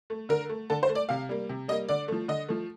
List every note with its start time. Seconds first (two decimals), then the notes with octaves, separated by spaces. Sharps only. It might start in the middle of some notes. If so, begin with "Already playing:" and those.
0.10 A3
0.29 D3 A#4
0.49 A3
0.70 D3 A4
0.83 C5
0.89 A3
0.95 D5
1.09 C3 F5
1.29 G3 A#3
1.49 C3
1.68 G3 A#3 D#5
1.89 D3 D5
2.08 F3 A3
2.28 D3 D#5
2.48 F3 A3